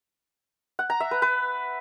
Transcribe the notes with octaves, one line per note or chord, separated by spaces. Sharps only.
F#5
A#5
E5
B4
B4